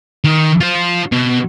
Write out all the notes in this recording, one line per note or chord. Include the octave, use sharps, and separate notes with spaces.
D#3
F4 C5
B2